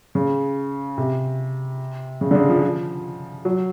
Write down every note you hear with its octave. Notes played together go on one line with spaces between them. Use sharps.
C#3
C3
C#3
D3
C#3
F3
F3
F#3